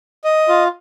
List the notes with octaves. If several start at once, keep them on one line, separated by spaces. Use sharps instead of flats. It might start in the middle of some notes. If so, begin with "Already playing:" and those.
D#5
F4